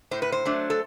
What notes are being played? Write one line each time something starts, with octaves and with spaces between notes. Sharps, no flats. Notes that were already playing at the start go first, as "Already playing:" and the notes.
A2 C5
B4
C5
F#3 A3 D4
A4